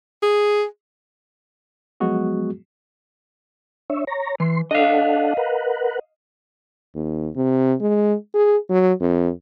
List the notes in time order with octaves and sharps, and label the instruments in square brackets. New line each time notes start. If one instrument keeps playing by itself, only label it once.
[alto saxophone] G#4
[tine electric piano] F3 F#3 G#3 B3 F#4 G#4
[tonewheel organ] D4 C#5 E5
C#5 A#5
[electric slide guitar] E3 [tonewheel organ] C6
[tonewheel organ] D4 A4 F#5 [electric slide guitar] D#5 F5
[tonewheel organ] A#4 B4 F#5
[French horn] D#2
C3
G#3
G#4
F#3
F2